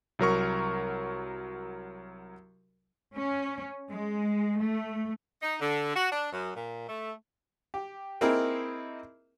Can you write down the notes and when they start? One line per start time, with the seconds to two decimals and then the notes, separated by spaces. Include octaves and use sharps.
0.19 C2 F#3 A#4 C#6
3.15 C#4
3.90 G#3
4.60 A3
5.42 D#4
5.61 D3
5.95 F#4
6.12 D4
6.32 F#2
6.56 A#2
6.88 A3
7.74 G4
8.21 A#3 C4 D#4 E4 G#4 A#4